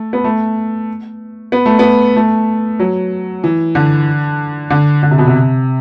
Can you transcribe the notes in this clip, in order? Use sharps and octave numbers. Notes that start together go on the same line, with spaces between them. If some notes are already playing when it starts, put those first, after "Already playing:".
Already playing: A3
B3
A3
B3
A3
B3
A3
F#3
E3
D3
D3
D3
C3
B2
C3